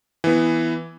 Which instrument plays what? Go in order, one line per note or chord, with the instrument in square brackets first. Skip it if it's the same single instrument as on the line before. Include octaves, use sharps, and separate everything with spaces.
[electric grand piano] E3 B3